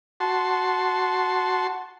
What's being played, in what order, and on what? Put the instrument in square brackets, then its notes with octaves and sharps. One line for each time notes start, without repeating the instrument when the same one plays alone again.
[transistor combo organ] F#4 A5 C6